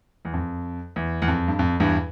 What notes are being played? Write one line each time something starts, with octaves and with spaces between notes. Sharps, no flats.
E2
F2
E2
E2
F2
G2
F2
E2 G2